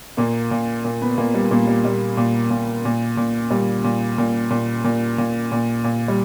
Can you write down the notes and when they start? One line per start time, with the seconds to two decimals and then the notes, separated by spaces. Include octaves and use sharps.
0.17 A#2 A#3
0.51 A#2
0.85 A#2
1.02 B3
1.18 A#2 A#3
1.34 G3
1.51 A#2 A#3
1.67 G3
1.84 A#2 G3
2.17 A#2
2.50 A#2
2.85 A#2
3.17 A#2
3.50 A#2 G3
3.84 A#2
4.18 A#2
4.50 A#2
4.84 A#2
5.18 A#2
5.52 A#2
5.84 A#2
6.08 G3